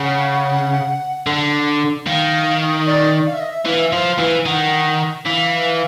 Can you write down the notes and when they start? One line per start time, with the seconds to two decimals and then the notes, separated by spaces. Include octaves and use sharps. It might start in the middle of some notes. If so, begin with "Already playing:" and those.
Already playing: C#3 F#5
1.27 D3
2.07 D#3 F5
2.86 D5
3.27 F5
3.34 E5
3.40 D#5
3.48 E5
3.65 E3 F5
3.77 E5
3.88 F3 F5
4.19 E3
4.46 D#3 F#5
5.25 E3 F5